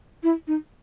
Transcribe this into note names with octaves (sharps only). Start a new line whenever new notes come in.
E4
D#4